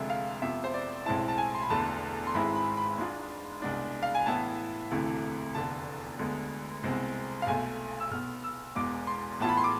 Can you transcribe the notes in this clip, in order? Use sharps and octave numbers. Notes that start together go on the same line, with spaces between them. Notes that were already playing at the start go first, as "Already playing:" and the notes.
Already playing: F1 F2 D3 G#3 E5
F5
F2 C3 F3 B3 E5
C5
D5
B1 A2 G#3 C4 E4 A5
A5
G#5
C6
B5
E1 E2 D3 A3 A5
C6
G#1 G#2 G#3 C4 E4 B5
B5
B5
G#2 G#3 D4 F4
C2 B2 G#3 B3 D4
F5
G#5
A2 E3 B3 E4 A5
E1 D2 C3 E3 A3
F1 E2 D3 A5
D2 D3 G#3 B3
C2 B2 G#3 C4
F5
B1 B2 A3 G#5
E6
B1 B2 B3 F6
E6
E1 E2 B2 G#3 D6
C6
A2 E3 B3 F4 A5
B5
C6
D6